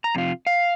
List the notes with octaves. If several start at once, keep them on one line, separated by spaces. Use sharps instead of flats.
A#5
F2 C3 F4
F5